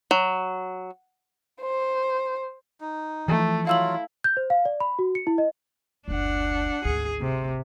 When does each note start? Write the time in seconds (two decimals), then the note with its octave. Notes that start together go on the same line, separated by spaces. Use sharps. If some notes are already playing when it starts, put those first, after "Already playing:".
0.11 F#3
1.62 C5
2.81 D#4
3.28 E3 F3 A3
3.67 F#3 E4 F4 F5 E6 F#7
4.24 G6
4.37 C5
4.50 F5
4.65 D5
4.80 B5
4.99 F#4
5.15 C#7
5.27 E4
5.38 D#5
6.08 F#1 D2 D4 F#5
6.85 G#1 D2 G#4
7.20 C3